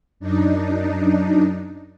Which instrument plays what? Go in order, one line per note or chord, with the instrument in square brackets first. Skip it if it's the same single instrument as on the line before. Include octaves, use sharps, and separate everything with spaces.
[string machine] F#2 D4 D#4